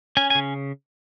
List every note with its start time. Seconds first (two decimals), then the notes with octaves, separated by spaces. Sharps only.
0.17 C#4 G#5
0.30 G#5
0.35 C#3